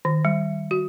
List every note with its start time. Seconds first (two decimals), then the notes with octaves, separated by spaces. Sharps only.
0.05 D#3
0.25 G3
0.71 F#4